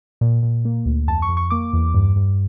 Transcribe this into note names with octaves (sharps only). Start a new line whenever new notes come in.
A#2
A#2
A#3
D2
F2 A5
C#6
F2
C#6
A#3 D6
E2
G2
G2